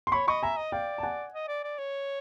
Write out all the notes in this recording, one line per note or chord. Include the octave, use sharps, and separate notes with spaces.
C6
C#5 B5 C#6
D#5 B5 C#6
E5 G#5 A#5
D#5
D5 F5 G5
A5
F#5 G#5
D#5
D5
D5
C#5